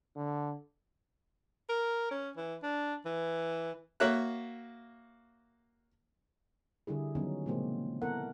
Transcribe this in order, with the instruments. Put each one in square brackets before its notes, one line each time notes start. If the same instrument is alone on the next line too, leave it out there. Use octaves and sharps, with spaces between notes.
[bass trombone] D3
[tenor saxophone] A#4
C#4
E3
D4
E3
[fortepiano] A#3 F#4 C#5 E5 F#6
[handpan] D3 G3 E4 G#4
D#3 F#3 G3 B3 C#4 D#4
A#2 C#3 F3 G#3 A#3 C4
B3 E4 A4 A#4 F#5